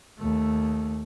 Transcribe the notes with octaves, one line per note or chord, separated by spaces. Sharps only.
D#2 A3